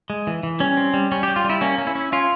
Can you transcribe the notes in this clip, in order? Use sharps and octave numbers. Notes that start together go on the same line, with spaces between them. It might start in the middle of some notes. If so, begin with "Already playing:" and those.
G#3
E3
E3
G3 C#4
C4
G3
G3 C#4
G3 G4
F4
G3
E4
A#3 C#4
C#4
E4
C#4
C#4 F4